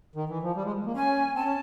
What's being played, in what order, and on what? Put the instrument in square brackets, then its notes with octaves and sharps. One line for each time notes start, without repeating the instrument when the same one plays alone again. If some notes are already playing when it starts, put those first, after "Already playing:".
[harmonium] D#3
E3
F3
G3
G#3
A#3
[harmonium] C#4 [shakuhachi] G#5
[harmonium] C4 [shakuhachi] A5
[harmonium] C#4